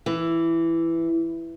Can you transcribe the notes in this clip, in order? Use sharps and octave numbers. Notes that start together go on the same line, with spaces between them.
E3